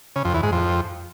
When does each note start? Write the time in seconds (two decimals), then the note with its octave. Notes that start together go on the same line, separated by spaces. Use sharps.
0.16 C#3
0.25 F2
0.34 E2
0.43 G#2
0.52 F2